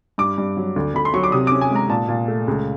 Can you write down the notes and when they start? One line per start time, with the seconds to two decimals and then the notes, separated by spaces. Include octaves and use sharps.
0.18 G2 D6
0.38 G2
0.57 F#3
0.76 D2
0.94 D2 B5
1.05 C6
1.14 F#3 C#6
1.23 D6
1.32 C3 D#6
1.47 C#4 D6
1.61 G#5
1.71 G#3 A#5
1.89 A#2 A5
2.08 A#2
2.28 A3
2.48 C#2